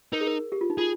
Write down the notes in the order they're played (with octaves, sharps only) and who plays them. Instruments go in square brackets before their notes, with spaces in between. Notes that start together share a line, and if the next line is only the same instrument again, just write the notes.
[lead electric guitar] D#4 [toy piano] A#4
[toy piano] G#4
A#4
G4
F4
D#4
[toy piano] F4 [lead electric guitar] G#4